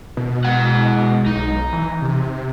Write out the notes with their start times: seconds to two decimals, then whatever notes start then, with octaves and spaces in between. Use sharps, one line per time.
0.17 B2
0.45 G#3 F#5
1.26 B1 D#4
1.73 E3
2.02 C3